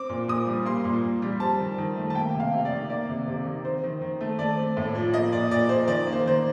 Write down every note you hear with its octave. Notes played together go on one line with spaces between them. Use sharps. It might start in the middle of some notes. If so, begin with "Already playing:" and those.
Already playing: C4 D6
A#2
A#2 D#6
G3
A#3 C6
A#2
A#2
G3
C4 A5
D#3
D#3
A3
A5
A#3 G5
C3
F5
C3
D5
D#3
A#3 D5
C3
C3
D#3
C4 C5
D#3
D#3
A3
A3 D5
C4
A2
F3
A#3 D#5
A#2 D5
A#2 D5
F3 C5
D#3 D5
A#3
C5
D#3 C5